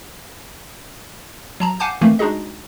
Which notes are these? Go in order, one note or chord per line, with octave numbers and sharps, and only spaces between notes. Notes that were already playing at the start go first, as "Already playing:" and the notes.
F#3 A5 A#5
F5 F#5 G#5 A5 D6 G6
D#3 E3 A3 A#3 C4
G#3 D4 D#4 F#4 G#4 D#5